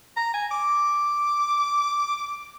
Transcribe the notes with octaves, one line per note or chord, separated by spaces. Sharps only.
A#5
G#5
D6